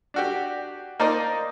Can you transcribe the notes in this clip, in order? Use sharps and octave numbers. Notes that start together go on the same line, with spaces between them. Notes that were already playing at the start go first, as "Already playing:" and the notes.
D4 F#4 G4
A#3 D#4 A#4 C5 D5 D#5